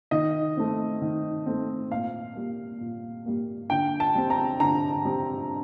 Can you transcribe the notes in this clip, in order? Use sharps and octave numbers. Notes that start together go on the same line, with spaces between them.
D#3 D#5
A3 C4
D#3
A3 C4
A#2 F5
G3 A#3
A#2
G3 A#3
D3 G5
A5
G3 C4
A#5
D3 A#5
G3 C4